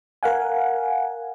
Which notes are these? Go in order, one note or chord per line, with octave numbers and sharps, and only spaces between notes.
A#4 F5 F#5 G#5